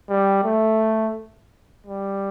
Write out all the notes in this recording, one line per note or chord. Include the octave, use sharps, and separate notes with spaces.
G3
A3
G3